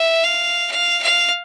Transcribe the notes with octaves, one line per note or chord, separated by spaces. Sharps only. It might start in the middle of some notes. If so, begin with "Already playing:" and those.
Already playing: E5
F5
F5
F5